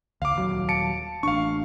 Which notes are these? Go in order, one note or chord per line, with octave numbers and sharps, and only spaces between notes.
C#2 F5 D6
D#1 F#3
A5 C#7 D7
A1 D4 F5 C#6